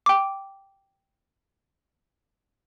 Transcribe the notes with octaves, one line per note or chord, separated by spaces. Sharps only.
G5 D6